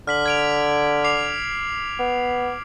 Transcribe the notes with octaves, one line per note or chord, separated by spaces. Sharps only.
D3 F6 B6 F#7
G#6 D7 F7
D6 C7 F7
B3